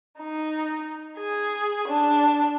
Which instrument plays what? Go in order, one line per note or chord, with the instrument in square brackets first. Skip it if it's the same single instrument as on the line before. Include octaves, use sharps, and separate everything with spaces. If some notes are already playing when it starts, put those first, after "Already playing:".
[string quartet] D#4
G#4
D4